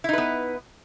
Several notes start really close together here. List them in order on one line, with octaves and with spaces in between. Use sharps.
E4 D#4 B4 B3